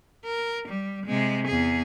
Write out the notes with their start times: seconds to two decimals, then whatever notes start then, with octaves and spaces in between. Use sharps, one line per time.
0.25 A#4
0.68 G3
1.06 C3 G#3
1.47 E2 G#4